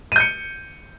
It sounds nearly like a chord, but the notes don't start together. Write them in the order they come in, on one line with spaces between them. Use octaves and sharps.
D#7 G6 C#7